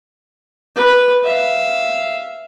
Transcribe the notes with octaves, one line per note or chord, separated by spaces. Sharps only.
B4
E5 F5